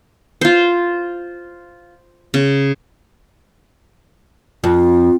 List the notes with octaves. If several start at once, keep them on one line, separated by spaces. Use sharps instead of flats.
F4 C5
C#3
F2 F4